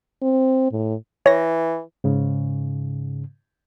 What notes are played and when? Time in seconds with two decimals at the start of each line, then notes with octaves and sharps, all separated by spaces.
0.22 C4
0.72 A2
1.26 E3 C#5 A#6
2.04 G#2 C#3